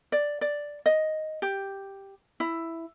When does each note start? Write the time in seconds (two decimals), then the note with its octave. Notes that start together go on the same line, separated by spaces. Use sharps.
0.12 D5
0.41 D5
0.86 D#5
1.42 G4
2.40 E4